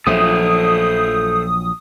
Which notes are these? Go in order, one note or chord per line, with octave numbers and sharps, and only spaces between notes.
A#1 F3 F#3 A4 C5 E5 D#6